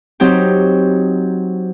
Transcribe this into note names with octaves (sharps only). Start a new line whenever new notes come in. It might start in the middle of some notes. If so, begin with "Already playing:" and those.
F#3 C4 D#4 G4